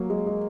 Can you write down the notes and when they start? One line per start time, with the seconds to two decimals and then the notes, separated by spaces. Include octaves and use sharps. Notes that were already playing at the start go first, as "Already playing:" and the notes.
Already playing: F#3 A#3
0.10 G#3
0.26 G#3